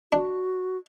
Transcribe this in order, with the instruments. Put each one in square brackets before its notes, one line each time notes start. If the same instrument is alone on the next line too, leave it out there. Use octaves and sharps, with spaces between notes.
[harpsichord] D4 [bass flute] F#4